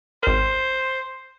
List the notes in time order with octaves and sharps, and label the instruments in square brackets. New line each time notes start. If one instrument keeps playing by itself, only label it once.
[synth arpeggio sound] G#1 A#4 [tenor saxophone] C5